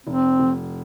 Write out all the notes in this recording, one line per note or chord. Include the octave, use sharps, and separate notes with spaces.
F1 C4
F1